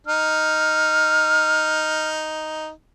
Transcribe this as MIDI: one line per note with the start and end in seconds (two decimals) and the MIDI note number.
0.07 2.70 63
0.07 2.09 89